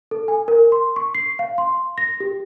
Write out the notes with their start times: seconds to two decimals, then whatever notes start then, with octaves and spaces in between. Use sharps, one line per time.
0.11 A4
0.28 G#5
0.48 A#4
0.72 C6
0.96 C#6
1.15 C7
1.39 F5
1.58 C6
1.98 A#6
2.20 G4